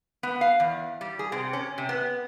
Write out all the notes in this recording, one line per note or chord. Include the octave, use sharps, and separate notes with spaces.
B3
F5
E2
G3
G#4
C3
C#4
C3
B3